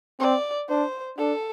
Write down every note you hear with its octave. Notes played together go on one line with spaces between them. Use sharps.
C4 D5
D4 C5
D4 A4